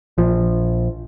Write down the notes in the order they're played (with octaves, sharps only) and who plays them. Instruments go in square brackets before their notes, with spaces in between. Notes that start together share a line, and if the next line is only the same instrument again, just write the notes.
[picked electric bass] A#1 F3